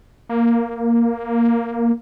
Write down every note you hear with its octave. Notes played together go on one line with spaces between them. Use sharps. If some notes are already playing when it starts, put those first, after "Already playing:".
A#3